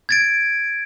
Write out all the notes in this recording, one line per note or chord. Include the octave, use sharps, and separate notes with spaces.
G#6 A6 D7